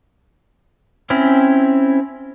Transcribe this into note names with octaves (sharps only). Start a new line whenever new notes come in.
C4 C#4 E4